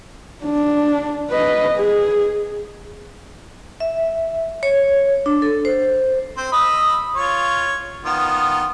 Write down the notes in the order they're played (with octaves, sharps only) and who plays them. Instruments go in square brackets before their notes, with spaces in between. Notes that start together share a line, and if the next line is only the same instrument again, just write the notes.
[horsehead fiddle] D4
B4 D#5
G#4
[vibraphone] E5
C#5
D4
A4
C5
[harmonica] C4 C5
D#5 B5 E6
F4 C#5
D#3 B3 F4